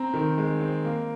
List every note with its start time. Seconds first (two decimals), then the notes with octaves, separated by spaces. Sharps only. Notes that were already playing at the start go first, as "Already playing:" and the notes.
Already playing: C4 A#5
0.14 D#3
0.38 G#3
0.60 C4
0.85 A#3